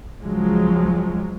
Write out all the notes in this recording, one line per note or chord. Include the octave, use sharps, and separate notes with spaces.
C#2 F3 F#3 G#3